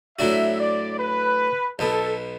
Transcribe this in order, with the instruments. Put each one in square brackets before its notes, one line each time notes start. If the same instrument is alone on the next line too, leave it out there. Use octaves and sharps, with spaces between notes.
[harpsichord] A2 F#3 D4 F#4 [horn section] E5
[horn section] D5
B4
[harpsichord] B1 B2 B3 [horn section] A4